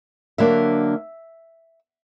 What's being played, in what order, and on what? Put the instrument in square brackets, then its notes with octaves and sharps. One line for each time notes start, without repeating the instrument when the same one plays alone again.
[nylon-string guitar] D3 F#3 A#3 D4 E5